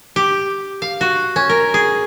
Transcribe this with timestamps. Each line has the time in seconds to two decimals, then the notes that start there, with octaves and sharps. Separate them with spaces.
0.16 G4
0.82 F5
1.01 F#4
1.36 C#4
1.49 A#4
1.74 G#4